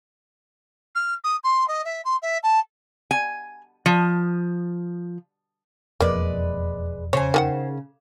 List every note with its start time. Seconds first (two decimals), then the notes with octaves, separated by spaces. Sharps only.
0.95 F6
1.24 D#6
1.43 C6
1.68 D#5
1.85 E5
2.04 C6
2.22 E5
2.43 A5
3.11 G#5
3.86 F3
6.00 E1 F2 G#3 A#3 B4 D5
7.13 C#3 C5 C#5 G#5
7.34 D#3 G#4 F#5